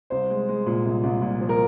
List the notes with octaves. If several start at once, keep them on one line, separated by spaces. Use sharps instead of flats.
C2 C5
G#3
G#3
A#2
C2
C2
A#2
F3
A#4